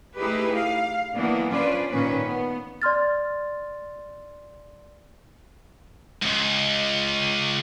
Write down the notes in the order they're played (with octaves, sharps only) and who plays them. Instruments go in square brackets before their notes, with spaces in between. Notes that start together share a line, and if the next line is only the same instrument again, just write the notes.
[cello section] A3 D#4 E4 G4 G#4 B4
F5
E3 F#3 A#3 B3 D4
C#4 D4 F4 B4 C5 D5
A#2 D#3 A#3 C#4 B4
B3
[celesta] D5 C6 F6 A6
[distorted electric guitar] C#2 G#2